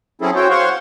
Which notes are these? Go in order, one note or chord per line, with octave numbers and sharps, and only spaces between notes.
F#3 C4 C#4 E4 G#4 A4
F#4 C5 C#5 G5
C5 C#5 F5 F#5 C6 C#6